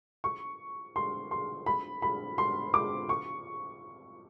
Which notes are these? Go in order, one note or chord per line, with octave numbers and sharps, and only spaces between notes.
C#6
C6
C6
B5
B5
C6
D6
C#6